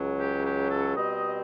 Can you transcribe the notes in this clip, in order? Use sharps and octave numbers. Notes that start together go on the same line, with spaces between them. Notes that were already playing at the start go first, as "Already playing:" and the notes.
Already playing: C#2 C#3 F#3
G4
G4
A4
B2 G3 C4 D#5